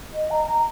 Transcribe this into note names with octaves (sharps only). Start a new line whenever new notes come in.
D#5
A#5
A#5